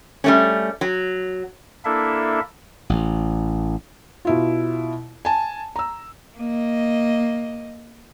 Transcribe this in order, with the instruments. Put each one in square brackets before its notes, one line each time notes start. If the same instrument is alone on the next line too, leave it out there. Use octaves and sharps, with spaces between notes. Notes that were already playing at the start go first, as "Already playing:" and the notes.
[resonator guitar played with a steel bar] G3 A3 C#4
F#3
[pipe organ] A#3 D4 E4 A4 E5
[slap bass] A1
[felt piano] B2 E4 F4
G#5 A5
A#5 E6
[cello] A#3 D#5